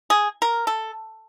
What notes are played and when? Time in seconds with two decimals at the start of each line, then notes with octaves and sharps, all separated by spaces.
0.10 G#4
0.42 A#4
0.67 A4